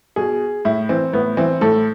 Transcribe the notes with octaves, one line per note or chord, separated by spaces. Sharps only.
B2 G#4
A2 E4
E3 C4
A2 B3
E3 C4
A2 A4